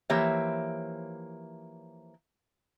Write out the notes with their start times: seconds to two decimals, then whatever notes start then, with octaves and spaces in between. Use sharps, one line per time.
0.10 E3 F3 A#3 G4 C#5 E5